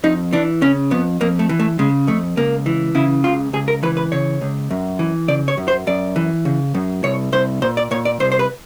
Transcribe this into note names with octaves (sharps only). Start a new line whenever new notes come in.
F2 D#4
E3 D4
C#3 C#4
F2 B3
F2 A#3
A3
E3
A3
C#3 G#3
F2 A3
C#2 A#3
E3
C#3 E4
C#2 F4
C#2 G#4
A#4
E3 B4
B4
C#3 C#5
C#2
F#2
E3
C#3 D5
C#5
F#2
C5
F#2 D5
E3
C#3
F#2
C2 C#5
C2 C5
A#2 C5
D5
A#2 C#5
D5
C2 C5
C5
B4